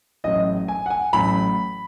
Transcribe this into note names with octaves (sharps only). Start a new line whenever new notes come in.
A1 A2 F#3 D#5
G#5
F#5
G#5
A1 A2 F#3 B5